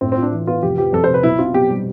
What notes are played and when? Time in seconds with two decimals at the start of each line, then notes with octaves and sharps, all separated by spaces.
0.01 A2 C4
0.12 C4 F4
0.22 D4
0.32 E3
0.47 B3 F4
0.63 F1 G4
0.78 F3 G4
0.93 F2 A4
1.04 C3 C5
1.14 B4
1.23 B1 E4
1.39 C4 F4
1.54 B2 G4
1.70 G3